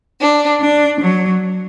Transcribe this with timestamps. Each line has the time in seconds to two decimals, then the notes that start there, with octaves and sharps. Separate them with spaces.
0.21 D4
0.61 D4
1.00 F#3